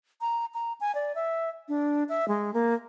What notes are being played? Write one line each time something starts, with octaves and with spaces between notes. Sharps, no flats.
A#5
A#5
G#5
D5
E5
D4
E5
G#3
A#3